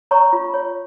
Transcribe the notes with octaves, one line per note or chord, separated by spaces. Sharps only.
C#5 A#5 C#6
F4
C#5